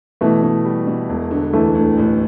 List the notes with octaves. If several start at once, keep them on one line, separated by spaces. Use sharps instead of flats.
B2 E3 A3
B2
G3
B2
E1
D3
D2 E3 A3
D2
A1